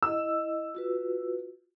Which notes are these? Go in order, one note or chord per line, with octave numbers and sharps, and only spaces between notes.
E4 D#5 E6
F4 F#4 B4